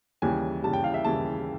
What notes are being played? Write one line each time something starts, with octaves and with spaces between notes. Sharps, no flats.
D#2 C#3 E3 G3 G#5
D#2 C#3 E3 G3 A5
G5
F5
E5
D#2 C#3 E3 G3 A5